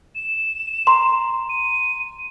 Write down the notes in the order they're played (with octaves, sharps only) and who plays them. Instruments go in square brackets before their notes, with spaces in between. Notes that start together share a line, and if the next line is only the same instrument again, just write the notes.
[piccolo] E7
[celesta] A#5 C6
[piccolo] D#7